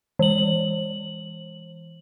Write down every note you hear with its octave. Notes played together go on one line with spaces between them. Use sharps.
E3 F#7